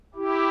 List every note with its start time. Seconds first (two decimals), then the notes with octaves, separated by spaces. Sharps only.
0.15 E4 G4